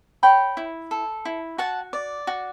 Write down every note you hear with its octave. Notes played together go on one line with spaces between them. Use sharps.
C#5 G5 B5
E4
A4
E4
F#4 F#5 A5
D5
F#4